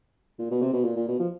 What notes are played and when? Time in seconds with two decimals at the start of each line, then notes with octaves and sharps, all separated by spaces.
0.39 A#2
0.51 B2
0.62 C3
0.73 B2
0.84 A#2
0.96 A#2
1.08 B2
1.20 F3